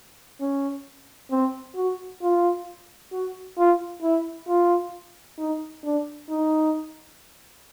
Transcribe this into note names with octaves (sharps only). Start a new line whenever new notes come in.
C#4
C4
F#4
F4
F#4
F4
E4
F4
D#4
D4
D#4